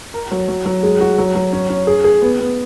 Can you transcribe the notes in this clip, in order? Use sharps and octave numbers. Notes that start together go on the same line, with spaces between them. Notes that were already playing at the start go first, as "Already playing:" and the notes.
A#4
F#3
F#3
F#3
G#3
F#4
F#3
F#3
C#4
C#4
G#4
G#4
B3
B3